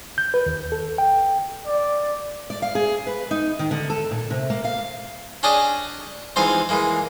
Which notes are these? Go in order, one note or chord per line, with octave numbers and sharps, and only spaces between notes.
G6
B4
D#2
A4
G5
D5
D5
F5
G#4
B4
D#4
D#3
D3
A4
A#2
C3
A#3
F5
C#4 D4 G4 G#4 D5 D#5
G#2 E3 F3 C4 F5 G#5
E3 G#3 A#3